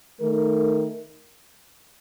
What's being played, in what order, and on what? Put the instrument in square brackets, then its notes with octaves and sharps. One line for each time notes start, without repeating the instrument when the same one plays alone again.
[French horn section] D#3 A3 D#4 A#4